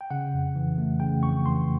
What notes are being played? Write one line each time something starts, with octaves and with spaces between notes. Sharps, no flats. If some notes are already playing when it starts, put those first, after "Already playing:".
G5
C#3 F#5
F2
E3
A3
C#3 G5
F2 C#6
E3 C6